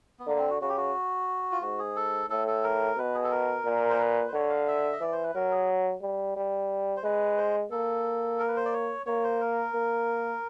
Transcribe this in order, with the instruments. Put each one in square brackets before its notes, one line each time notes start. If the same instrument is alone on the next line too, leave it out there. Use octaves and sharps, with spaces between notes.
[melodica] B3
[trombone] D3 [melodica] A#3
[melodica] C4
F#4
[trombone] C#3 [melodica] F#4
[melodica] G4
F#4
F4
[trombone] G#2 [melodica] F#4
[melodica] G#4
A4
[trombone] A2 [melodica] A4
[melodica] A4
A#4
[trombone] B2 [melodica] B4
[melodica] G#4
A4
A#4
[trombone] A#2
[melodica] C5
B4
C5
[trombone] D3 [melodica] C#5
[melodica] F5
E5
D#5
[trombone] E3 [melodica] D5
[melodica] C5
B4
[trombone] F#3 [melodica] A#4
[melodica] G#4
[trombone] G3
G3
[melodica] C5
[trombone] G#3 [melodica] B4
[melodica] C5
[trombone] A#3 [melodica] A4
[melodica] A#4
B4
C5
D5
C#5
[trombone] A#3 [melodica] C#5
[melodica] C5
A#4
[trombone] A#3